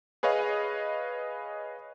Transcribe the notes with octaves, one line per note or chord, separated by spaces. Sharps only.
G#4 B4 C#5 D#5 F5